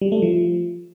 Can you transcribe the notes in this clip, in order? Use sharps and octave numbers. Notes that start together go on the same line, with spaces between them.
G3
A3
F3